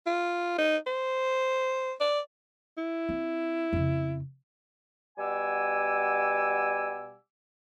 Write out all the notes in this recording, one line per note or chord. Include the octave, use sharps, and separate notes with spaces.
F4
D#4
C5
D5
E4
C4
F2 C#3
B2 G3 F#5 G#5 D6 E6